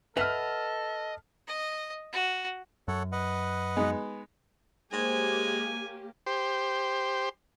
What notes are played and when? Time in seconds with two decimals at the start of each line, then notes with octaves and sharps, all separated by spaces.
0.17 A4 B4 D#5 E5 F#5 F6 B6 F7
1.47 D#5
2.13 F#4
2.88 F#2 A4 C#5 F#5
3.12 B4 D#5 F#5
3.77 G#3 B3 D#4
4.92 G#3 A#3 G4 C5 C#5 G5 G#5
6.26 G4 C5